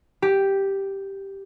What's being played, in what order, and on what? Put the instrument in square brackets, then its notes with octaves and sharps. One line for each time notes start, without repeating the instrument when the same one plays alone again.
[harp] G4